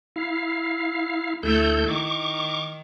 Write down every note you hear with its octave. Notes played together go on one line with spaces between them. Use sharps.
E4 F5
D2 A3 E4 A4 G6
D#3 C#6 D6